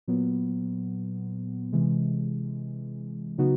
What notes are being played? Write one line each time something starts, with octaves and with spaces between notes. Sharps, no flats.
A#2 F#3 B3
C3 E3 G#3
C#3 F#3 B3 D#4 F#4